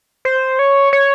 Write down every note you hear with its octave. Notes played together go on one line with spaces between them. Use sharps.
C5
C#5
C#5